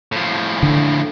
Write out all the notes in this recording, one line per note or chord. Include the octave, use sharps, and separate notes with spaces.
A2 F3
D3